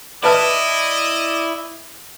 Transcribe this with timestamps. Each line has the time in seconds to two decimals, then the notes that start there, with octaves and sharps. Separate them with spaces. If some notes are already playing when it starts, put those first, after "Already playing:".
0.24 E4 B4 D5 D#5 A5 F6